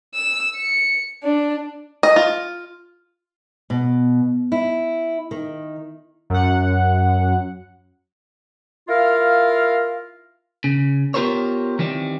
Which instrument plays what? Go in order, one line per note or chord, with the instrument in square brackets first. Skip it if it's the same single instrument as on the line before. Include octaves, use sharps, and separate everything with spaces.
[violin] E6
C#7
D4
[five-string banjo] D#5
F4
[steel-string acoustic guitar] B2
E4
D#3
[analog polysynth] F#2 F#5
[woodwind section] E4 F4 A#4 F5
[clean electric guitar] C#3
B3 F4 G4 A#4 C5 C#5
D#3 E3 G3 C4